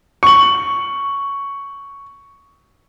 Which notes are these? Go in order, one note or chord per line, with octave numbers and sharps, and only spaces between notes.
C#6 F#7